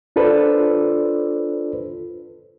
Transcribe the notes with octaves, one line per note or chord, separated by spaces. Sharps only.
D4 F4 A4 B4 C5 D5